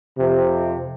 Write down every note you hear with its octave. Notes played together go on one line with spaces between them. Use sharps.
F2 C3